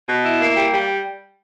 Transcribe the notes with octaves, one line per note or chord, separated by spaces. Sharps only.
B2
E4
A#3
G3
G3